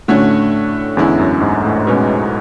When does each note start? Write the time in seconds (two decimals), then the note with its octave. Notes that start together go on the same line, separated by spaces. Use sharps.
0.08 A2 D3 A3 C#4 F#4 C#5
0.97 E2 D3 G#3 C#4 E4
1.19 F#2
1.41 G#2
1.65 A2
1.87 B2 G#3 C#4